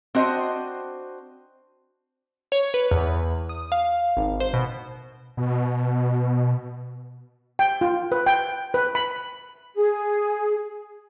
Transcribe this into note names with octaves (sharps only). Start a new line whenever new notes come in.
C4 D4 F#4 C5 D#5
C#5
B4
E2
D#6
F5
G#1
C5
B2
B2
G5
F4
B4
G5
B4
B5
G#4